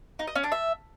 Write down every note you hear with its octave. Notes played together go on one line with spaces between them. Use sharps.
D#4
D#5
C#4
D4
E5